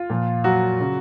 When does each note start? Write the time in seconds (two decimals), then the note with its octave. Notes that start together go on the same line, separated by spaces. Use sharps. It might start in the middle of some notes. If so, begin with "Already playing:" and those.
Already playing: F4
0.10 A#2 F3
0.44 F#3 F#4
0.80 C#3 F#3